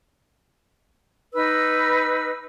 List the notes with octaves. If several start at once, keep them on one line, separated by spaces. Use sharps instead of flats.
D#4 B4 E6